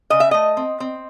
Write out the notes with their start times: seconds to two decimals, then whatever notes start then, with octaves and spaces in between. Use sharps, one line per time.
0.10 C#3 D#5
0.20 E5
0.31 A3 D#5
0.57 C4
0.80 C4